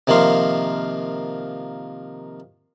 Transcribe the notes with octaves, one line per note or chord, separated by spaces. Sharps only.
C3 D#3 F3 A#3 C6